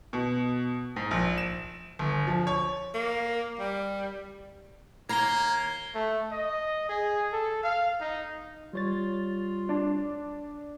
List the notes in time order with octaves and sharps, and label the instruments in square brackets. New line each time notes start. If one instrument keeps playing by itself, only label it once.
[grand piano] B2
G#2
A#1
E7
G1
F3
C#5
[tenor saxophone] A#3
G3
[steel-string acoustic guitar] D#2 A#5 [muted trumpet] A#3 [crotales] G#6 C7 G7
[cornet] A3
D#5
G#4
A4
F5
D#4
[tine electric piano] G3 C#5 A6 [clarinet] F4
[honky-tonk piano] D4